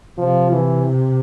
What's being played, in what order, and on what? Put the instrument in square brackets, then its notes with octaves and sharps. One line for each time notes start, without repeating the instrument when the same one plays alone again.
[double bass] C3 [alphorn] F3
[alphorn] E3